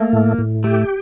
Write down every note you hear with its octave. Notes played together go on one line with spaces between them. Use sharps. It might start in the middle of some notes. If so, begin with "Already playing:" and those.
Already playing: A3 A#3
A2
A2
A3 G4